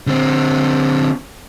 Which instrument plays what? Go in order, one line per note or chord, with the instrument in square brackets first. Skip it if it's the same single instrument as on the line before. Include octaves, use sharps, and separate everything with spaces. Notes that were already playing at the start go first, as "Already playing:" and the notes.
[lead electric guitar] D3 C4